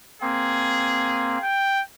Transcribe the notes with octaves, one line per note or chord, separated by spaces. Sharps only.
A#3 C4 G#4
G5